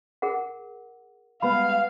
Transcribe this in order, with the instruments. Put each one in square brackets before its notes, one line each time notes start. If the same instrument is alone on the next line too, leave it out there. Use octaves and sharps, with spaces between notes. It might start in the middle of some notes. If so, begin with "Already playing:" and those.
[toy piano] G#4 A#4 F#5
[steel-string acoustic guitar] G3 G#3 B3 [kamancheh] F5 [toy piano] B5